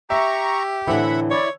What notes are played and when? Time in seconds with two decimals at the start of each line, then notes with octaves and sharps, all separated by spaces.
0.10 G4 E5 A#5 C#6
0.87 A2 D3 E3 C4 E5 F#5 B5
1.31 E4 C#5 D5